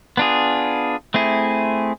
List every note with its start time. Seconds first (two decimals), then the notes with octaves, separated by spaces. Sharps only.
0.17 B3 D4 F4 G#4
1.14 A3 C4 E4 G#4